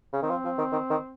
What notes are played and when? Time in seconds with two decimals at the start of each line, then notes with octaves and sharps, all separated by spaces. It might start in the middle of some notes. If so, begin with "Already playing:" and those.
0.13 C#3
0.17 C4
0.22 D#3
0.30 F3
0.45 F3
0.58 D#3
0.72 D#3
0.90 D#3